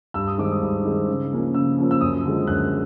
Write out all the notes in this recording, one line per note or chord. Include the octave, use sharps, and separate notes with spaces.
G2 E6
D#6
D#3 G#3 C4 D6
D#6
G2
D#3 G#3 C4
C#3
F3 A#3 C#4
C#3 E6
F3 A#3 C#4
E6
F#2 D#6
D3 F3 G#3
F#2 F#6